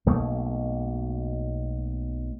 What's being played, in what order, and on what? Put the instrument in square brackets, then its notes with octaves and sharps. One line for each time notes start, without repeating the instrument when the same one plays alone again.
[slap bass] B1 B2 A3 A#3